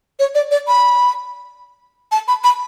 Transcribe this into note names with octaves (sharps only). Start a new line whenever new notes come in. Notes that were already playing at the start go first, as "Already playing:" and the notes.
C#5
D5
D5
B5
A5
B5
B5